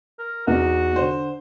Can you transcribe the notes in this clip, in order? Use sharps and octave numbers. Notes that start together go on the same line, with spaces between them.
A#4
E2 D#4 F#4
D3 C5